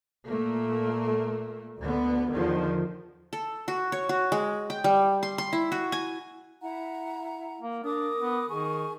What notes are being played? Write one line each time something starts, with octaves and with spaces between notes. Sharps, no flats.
A#2 A3 A#3
D2 D3 B3
E2 D3 D#3 F3
A4
F#4
C#5
F#4
G#3
G5
G3
C6
C6
E4
F#4
G#5
E4 F#5 A#5
A#3
D4 A#4 D6 D#6
B3
D#3 G#4 G#5 C#6